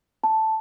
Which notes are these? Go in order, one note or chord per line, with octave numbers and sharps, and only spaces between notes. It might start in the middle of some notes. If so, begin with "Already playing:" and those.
A5